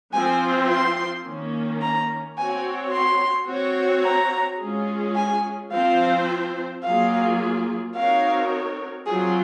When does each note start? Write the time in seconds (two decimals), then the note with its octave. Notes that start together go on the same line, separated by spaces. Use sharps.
0.13 F3 C4 F4 C5 G#5
0.70 C6
1.26 D#3 A#3 C#4
1.82 A#5
2.37 C4 F#4 C#5 G#5
2.93 C6
3.49 C4 F#4 C#5
4.04 A#5
4.60 G#3 C#4 F4 G#4
5.16 G#5
5.72 F3 C4 F4 C5 F5
6.84 F#3 A#3 F4 G#4 F5
7.95 C4 D#4 F#4 A#4 C#5 F5
9.07 F#3 C4 F4 G#4